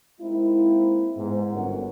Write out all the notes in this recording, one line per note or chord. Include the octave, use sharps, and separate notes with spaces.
G#3 A#3 C4 D#4 E4
G#2 B3
G1 C#4 F#4 A#4 F#5